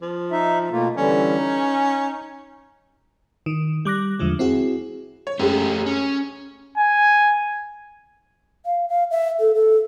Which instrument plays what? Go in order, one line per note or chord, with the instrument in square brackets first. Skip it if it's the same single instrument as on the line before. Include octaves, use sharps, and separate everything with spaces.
[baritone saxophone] F3
[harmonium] D#4 E5
[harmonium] B2 A#3 F4 [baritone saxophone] A3
[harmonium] D3 E3 G3 [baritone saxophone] C#4
[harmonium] D#4
[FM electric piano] D#3
G3 D6 F#6 A#6
E2 D3 F3 G#3
C4 E4 F#4 G#4
[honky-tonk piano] C#5
[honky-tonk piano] F#2 G#3 [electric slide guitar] A3 G4
[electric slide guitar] C#4
[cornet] G#5
[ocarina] F5
F5
E5
A4
A4